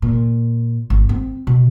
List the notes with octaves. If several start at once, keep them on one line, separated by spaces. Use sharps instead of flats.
A#2
G#1
C4
B2